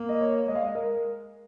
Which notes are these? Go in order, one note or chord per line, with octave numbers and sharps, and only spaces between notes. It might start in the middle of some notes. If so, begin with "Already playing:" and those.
Already playing: A#3
D#5
C#5
G#3 D#5
F5
D#5
A#4